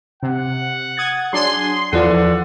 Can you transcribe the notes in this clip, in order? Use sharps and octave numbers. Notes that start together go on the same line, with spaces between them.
C3 F#5
D#6 G#6 A6
F#3 D4 G#4 C6
E2 E3 F3 A4 D5 F#5